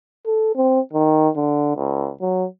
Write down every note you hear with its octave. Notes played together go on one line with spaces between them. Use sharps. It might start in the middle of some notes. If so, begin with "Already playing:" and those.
A4
C4
D#3
D3
C#2
F#3